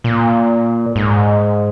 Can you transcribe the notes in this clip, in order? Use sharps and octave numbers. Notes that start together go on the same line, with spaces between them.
A#2
G#2